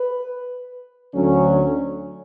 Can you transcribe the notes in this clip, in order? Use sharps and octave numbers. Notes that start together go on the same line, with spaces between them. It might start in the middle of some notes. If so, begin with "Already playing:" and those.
Already playing: B4
D2 D3 F#3 C#4